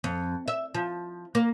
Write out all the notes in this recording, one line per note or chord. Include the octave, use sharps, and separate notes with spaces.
F2
E5
F3
A#3